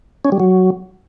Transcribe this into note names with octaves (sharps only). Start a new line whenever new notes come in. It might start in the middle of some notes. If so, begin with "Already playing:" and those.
C#4
G3
F#3